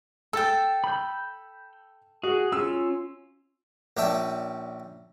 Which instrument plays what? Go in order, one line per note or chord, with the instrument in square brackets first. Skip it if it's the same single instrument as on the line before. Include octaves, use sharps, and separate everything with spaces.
[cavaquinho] A4 G5 [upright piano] E6 A6
[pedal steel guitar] B5 G6
[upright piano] F#4 [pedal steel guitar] G#4
[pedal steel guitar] C#4 F4 [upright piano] E6
[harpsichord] A#1 C#4 D5 E5 G5 A5